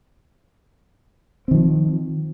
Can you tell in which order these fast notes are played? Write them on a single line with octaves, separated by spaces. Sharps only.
C4 D#3 F3